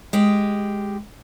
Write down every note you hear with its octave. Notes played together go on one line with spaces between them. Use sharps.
G#3 G4